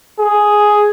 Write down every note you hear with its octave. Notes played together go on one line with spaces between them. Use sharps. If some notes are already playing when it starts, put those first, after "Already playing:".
G#4